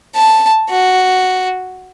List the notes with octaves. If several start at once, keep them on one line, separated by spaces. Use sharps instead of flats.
A5
F#4